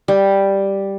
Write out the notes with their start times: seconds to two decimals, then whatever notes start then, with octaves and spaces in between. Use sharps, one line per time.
0.08 G3